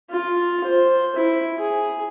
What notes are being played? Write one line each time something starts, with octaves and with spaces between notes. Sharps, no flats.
F4
C5
E4
G#4